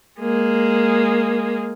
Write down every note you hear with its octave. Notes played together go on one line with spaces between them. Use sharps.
G#3 A#3